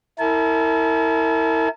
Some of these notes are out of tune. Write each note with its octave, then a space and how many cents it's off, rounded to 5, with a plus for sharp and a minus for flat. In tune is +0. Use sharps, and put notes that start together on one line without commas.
E4 -15 A#4 -35 A5 -45